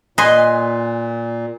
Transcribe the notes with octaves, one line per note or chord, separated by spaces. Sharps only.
A#2 B4 D#5 G#5 C6